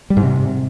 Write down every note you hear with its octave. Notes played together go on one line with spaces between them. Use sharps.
G3
G#2
C3